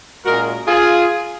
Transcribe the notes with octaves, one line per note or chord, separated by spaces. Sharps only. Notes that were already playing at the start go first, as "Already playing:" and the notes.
A#2 G#3 C#4 F#4 A#4
F4 G#4